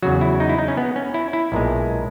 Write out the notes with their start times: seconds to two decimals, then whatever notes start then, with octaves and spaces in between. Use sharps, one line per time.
0.02 E2 C#3 F#3 F#4
0.21 E4
0.40 D#4
0.49 E4
0.59 D#4
0.68 C#4
0.77 B3
0.96 C#4
1.14 E4
1.33 E4
1.52 B1 A#2 G#3